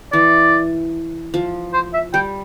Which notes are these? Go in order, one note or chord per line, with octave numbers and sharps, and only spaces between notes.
E3 D5
F3
C5
E5
G3 G5